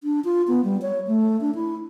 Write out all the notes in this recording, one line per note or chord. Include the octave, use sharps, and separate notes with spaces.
D4
F4
B3
G3
C#5
A3
D4
E4